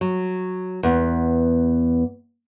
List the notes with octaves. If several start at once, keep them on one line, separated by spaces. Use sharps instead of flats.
F#3
E2 B3